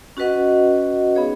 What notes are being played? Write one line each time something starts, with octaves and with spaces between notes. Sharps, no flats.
C#4 F#4 B4 D#5 F#5
B3 D#4 G#4 C#5 F5